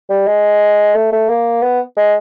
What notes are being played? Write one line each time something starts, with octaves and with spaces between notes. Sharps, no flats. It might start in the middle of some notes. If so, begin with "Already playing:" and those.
G3
G#3
A3
A3
A#3
B3
G#3